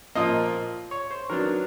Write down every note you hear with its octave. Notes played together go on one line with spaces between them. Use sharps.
A#2 F3 A#3 D#5
C#5
C5
D#3 F#3 B3 D4 A#4